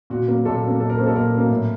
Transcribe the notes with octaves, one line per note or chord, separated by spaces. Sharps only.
A#2 F#4
F#3 A#3
A#2 A4
F#3 A#3
A#2 A4
A#4
F#3 A#3 C5
A4
A#2 A#4
F#3 A#3
A2